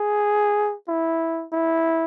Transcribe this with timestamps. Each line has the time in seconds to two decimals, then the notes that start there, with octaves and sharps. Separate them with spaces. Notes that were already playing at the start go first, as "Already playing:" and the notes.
Already playing: G#4
0.88 E4
1.52 E4